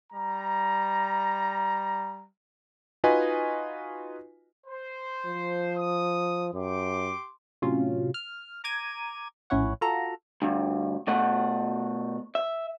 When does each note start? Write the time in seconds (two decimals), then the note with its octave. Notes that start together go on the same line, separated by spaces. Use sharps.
0.12 G3 A#5
3.04 D#4 F4 F#4 B4 D#5 G#5
4.66 C5
5.26 F3
5.76 D#6
6.54 F#2 G4 C6 D6
7.62 A2 C3 F#3 C#4 F4
8.14 F6
8.64 A#5 D6 G#6 D#7
9.50 A#1 A2 C#4 E4 C#5 F#5
9.81 F4 F#4 A4 A#5
10.42 D2 G2
11.07 B2 A3 F#5
12.35 E5